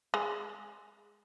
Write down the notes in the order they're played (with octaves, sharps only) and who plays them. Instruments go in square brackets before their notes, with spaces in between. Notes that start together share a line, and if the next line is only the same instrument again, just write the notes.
[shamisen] G#3